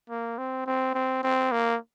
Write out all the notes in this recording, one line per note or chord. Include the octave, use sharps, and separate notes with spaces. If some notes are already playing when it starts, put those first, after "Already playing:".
A#3
C4
C4
C4
C4
A#3